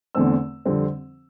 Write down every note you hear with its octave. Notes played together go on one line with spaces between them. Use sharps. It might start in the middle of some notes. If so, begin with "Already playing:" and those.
E2 D3 A3 C4 E6
F2 D3 G3 C4